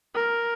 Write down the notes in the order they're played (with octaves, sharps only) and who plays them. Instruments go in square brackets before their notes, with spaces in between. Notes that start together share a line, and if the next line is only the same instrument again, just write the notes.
[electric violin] A#4